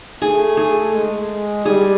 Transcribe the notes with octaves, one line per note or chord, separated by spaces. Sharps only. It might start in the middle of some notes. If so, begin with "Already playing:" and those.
A3 G#4
G#4
G#3
G3 G#4